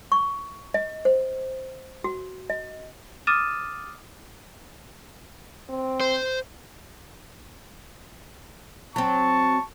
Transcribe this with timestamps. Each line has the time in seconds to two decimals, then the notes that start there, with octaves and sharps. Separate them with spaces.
0.12 C#6
0.74 D#5
1.05 C5
2.04 F#4
2.50 D#5
3.27 D6 D#6 F6 A6 D#7 E7
5.69 C4
6.00 C5
8.96 F#3 C4 A5 C#6